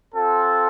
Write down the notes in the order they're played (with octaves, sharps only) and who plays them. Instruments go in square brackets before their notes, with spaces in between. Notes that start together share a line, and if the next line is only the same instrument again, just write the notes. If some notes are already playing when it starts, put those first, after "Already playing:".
[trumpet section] C4 F4 A4